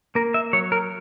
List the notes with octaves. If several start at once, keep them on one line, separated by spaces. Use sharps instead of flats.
A#3 A#4
E5
F#3 C#5
A#4